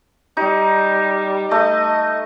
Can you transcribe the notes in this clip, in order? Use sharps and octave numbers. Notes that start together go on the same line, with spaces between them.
G3 D#4
A3 D#5